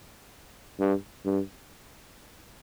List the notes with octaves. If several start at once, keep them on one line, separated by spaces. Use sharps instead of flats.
G2
G2